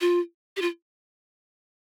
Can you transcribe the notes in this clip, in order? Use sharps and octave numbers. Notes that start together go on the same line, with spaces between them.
F4
G4
F4